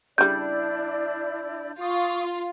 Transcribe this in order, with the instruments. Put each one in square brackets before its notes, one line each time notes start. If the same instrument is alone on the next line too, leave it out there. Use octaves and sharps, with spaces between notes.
[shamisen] C#3 G3 [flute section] D4 E4 D5 [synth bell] G6
[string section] F4 [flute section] C#6 D#6